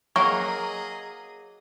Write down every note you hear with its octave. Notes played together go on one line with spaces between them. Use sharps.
F#3 A#3 G#4 A#4 D#5 C#6